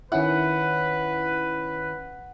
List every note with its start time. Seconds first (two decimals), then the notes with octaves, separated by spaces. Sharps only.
0.12 D#3 C#4 E4 B4 F#5